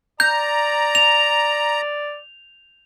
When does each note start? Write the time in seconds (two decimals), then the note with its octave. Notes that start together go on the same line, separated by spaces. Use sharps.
0.20 D5 A#5 G6
0.95 F7